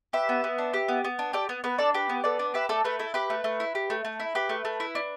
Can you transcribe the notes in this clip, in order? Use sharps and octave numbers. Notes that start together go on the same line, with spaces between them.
G4 B4 E5
B3
B3
D4
G4
B3
B3
D4
G4 A4 D5
B3
B3 B4
D4 A4 D5
G4 B4
B3
B3 A4 D5
D4
G4 B4 E5
A3 A4 D5
A3 B4
E4 A4
G4 B4
A3
A3
E4
G4
A3
A3
E4
G4 B4
A3
A3
E4
D4